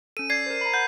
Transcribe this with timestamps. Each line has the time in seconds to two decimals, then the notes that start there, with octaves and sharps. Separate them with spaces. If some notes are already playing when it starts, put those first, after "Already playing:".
0.17 C#4 A4 D#7
0.30 D5 G#6 C7
0.46 A#4 C5
0.61 A#5 B5
0.74 F#5 B5 G6